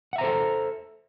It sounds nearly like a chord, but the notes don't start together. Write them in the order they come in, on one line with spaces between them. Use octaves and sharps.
F#5 E5 A#5 C5 A4